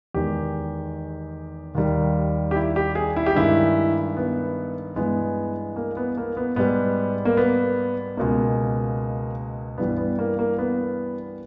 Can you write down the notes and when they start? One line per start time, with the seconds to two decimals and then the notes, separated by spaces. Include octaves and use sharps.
0.14 E2 D#3 G#3 G4
1.75 D#2 D#3 G3
2.51 G4
2.56 E4
2.76 G4
2.95 G#4
3.16 E4
3.26 G4
3.35 G2 D#3 G#3 E4
4.17 B3
4.96 G2 E3 G#3 B3
5.76 A#3
5.97 B3
6.17 A#3
6.37 B3
6.56 G#2 G3 B3
7.25 A#3
7.37 B3
8.17 C#2 B2 G#3 A#3
9.78 G2 E3 G3 B3
9.97 B3
10.19 A#3
10.39 A#3
10.58 B3